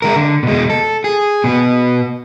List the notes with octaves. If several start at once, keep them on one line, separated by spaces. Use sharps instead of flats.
G#3 A#4
D3
B2 G#3
A4
G#4
B2 B3